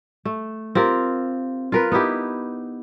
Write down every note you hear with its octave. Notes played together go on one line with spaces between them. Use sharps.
A3
C4 F4 G4 A#4
F4 A#4 B4
B3 D#4 E4 G4